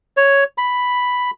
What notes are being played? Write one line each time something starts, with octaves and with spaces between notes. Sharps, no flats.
C#5
B5